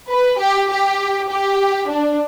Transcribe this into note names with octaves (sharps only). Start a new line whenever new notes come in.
B4
G4
G4
G4
D4